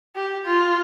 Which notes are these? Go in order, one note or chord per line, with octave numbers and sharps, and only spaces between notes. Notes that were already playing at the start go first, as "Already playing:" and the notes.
G4
F4